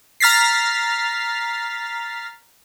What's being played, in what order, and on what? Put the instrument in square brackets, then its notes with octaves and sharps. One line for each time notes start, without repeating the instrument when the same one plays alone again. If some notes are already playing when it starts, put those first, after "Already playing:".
[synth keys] A#5 F6 A6 B6 C7